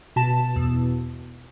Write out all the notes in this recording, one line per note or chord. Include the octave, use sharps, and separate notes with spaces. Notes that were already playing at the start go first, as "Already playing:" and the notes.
B2 A5
E2